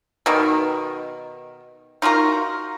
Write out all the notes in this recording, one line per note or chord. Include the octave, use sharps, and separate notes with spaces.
B2 D#3
D#4 F4 F#4 A#4